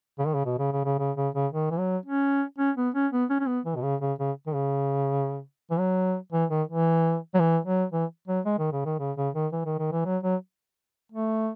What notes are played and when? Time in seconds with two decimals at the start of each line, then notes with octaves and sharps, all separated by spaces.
0.19 C#3
0.26 D#3
0.34 C#3
0.45 B2
0.58 C#3
0.72 C#3
0.85 C#3
0.99 C#3
1.16 C#3
1.34 C#3
1.52 D#3
1.71 E3
1.79 F#3
2.05 C#4
2.58 C#4
2.77 B3
2.95 C#4
3.12 B3
3.30 C#4
3.40 C#4
3.47 B3
3.65 E3
3.76 B2
3.83 C#3
4.01 C#3
4.19 C#3
4.46 D#3
4.54 C#3
5.71 E3
5.79 F#3
6.32 E3
6.50 D#3
6.68 E3
7.34 F#3
7.39 E3
7.66 F#3
7.92 E3
8.28 F#3
8.45 G#3
8.58 D#3
8.72 C#3
8.85 D#3
8.99 C#3
9.17 C#3
9.34 D#3
9.52 E3
9.65 D#3
9.79 D#3
9.92 E3
10.05 F#3
10.23 F#3
11.12 A3